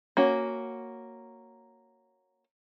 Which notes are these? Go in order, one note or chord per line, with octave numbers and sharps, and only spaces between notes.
A#3 C#4 F#4